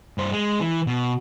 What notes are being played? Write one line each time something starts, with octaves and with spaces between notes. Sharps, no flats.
G2 C5
G#3
E3
B2